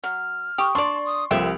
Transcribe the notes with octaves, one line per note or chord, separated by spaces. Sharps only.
F#3 F6
G4 C#6 D#6
D4 D5 A5 C6 C#6
D#6
C2 F3 F4 G4 A4 E5 D7